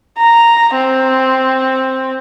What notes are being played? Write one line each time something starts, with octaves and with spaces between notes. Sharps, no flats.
A#5
C4